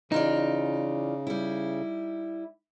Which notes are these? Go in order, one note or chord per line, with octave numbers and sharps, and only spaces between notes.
C#3 E3 D#4 F4 D5
G3 E4